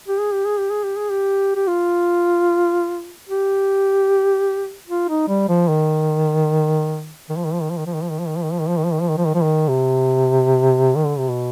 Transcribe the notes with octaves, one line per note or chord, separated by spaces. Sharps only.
G4
G#4
G4
G#4
G4
G#4
G4
G#4
G4
G4
F4
G4
F4
D#4
G3
F3
D#3
D#3
F3
D#3
F3
D#3
F3
D#3
F3
D#3
F3
D#3
F3
D#3
F3
D#3
F3
D#3
F3
D#3
F3
D#3
F3
D#3
F3
D#3
F3
D#3
C3
D#3
D3
C3
B2